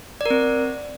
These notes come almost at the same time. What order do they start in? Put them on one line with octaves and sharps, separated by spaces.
D5 A#4 C4